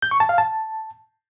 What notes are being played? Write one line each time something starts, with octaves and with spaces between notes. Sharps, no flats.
G6
C#6
A5
F5
A5